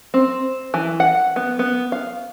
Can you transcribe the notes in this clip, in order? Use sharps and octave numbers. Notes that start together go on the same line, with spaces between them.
C4
E3
F#5
B3
B3
F5